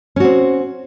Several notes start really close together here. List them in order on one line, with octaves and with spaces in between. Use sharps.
C#4 F#4 C4